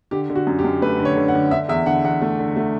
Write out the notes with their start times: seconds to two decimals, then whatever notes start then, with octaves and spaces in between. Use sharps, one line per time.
0.11 D3 G4
0.30 D3
0.35 F#4
0.47 F#2
0.59 G4
0.64 F#2
0.82 A3 B4
0.99 D3
1.05 C#5
1.16 D3
1.28 F#5
1.35 D3
1.51 D3 E5
1.69 E2 E5
1.86 D3 F#5
2.04 E2 F#5
2.22 A3
2.39 D3
2.56 A3